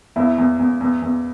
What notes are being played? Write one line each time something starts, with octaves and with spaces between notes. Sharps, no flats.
E2 E4
E2
E2
E2
E2